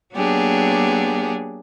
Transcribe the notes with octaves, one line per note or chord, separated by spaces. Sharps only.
F#3 A#3 B3 D4 G4 G#4